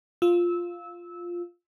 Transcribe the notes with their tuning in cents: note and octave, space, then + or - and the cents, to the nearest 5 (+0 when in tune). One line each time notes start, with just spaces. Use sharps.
F4 +0 E6 -20